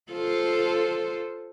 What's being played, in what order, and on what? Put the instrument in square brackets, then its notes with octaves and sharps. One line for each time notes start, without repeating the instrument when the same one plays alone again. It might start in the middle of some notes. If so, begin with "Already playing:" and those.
[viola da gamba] F4 A4 C5